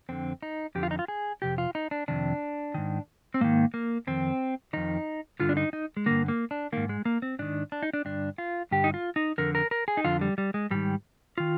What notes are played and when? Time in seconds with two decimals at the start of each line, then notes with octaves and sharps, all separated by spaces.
0.09 F2 D3 C4
0.42 D#4
0.75 F2 D3 G4
0.83 F4
0.91 D#4
0.99 F4
1.08 G#4
1.42 F2 C3 G4
1.58 F4
1.75 D#4
1.91 D4
2.08 F2 C3 D#3 D4
2.74 G#2 D#3
3.34 C4
3.41 G#2 D#3 A#3
3.74 A#3
4.07 F2 D#3 C4
4.73 F2 D#3 D#4
5.40 G2 D3 F4
5.49 D4
5.57 D#4
5.73 D#4
5.97 G#3
6.06 G2 D3 A#3
6.28 A#3
6.51 D4
6.72 G#2 D#3 A#3
6.89 G#3
7.05 A#3
7.22 C4
7.39 G#2 D#3 D4
7.72 D4
7.83 D#4
7.93 D4
8.05 G2 D3 D4
8.38 F4
8.71 G2 D3 G4
8.84 D#4
8.94 F4
9.16 D#4
9.38 F2 D3 A#4
9.55 A#4
9.71 A#4
9.88 G#4
9.97 D#4
10.04 F2 D3 F4
10.21 G3
10.38 G3
10.54 G#3
10.71 G#2 D#3 G3
11.38 D#3 F4